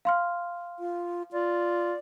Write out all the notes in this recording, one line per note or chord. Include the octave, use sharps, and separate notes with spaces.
F5 C6 F6
F4
F4 D5